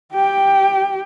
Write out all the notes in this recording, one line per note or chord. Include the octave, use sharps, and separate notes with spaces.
G4 G5